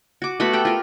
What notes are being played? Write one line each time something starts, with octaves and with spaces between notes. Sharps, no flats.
F#4 D6
A3 B3 F#4 B5
G4 A4 G5
F4 A#4